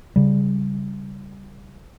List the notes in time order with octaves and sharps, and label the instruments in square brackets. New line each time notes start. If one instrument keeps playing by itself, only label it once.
[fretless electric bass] C#3 G3